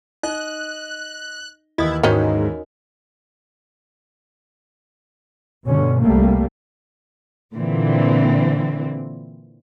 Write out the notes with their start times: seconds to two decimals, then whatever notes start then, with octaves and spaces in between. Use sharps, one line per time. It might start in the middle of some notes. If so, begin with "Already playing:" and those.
0.23 D#4 D#5 F#6
1.78 D#2 E3 E4 D#5 D#6
2.03 G#2 D#3 C#4 D#4 F#4 A#4 F5
5.67 G2 B2 D3 C#4
6.01 C2 G3 A3 A#3
7.53 A#2 D3 E3 C4